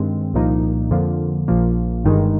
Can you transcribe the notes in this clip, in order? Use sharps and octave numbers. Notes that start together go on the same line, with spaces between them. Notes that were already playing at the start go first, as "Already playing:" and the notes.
Already playing: G2 D#3 G#3 C4
C2 A#2 F3 A#3 D#4
F2 D3 F3 A#3
A#1 A#2 F3 A#3
G1 G2 D#3 G#3 D#4